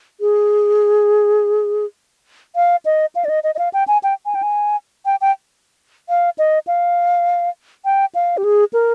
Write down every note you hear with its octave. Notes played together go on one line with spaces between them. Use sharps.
G#4
F5
D#5
F5
D5
D#5
D#5
D#5
F5
G5
G#5
G5
G#5
G5
G#5
G5
G5
F5
D#5
F5
G5
F5
G4
G#4
A#4